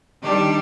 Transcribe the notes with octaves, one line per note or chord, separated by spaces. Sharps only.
D#3 G3 D4 G4